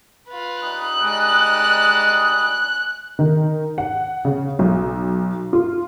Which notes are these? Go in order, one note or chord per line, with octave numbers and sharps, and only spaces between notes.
F4 B4
G3 D#4 D#6 F#6
G#3 D5
D#3
F#5
C#3
B1
F4